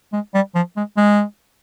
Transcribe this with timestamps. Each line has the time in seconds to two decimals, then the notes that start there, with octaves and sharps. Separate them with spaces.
0.13 G#3
0.34 G3
0.55 F3
0.77 G#3
0.97 G#3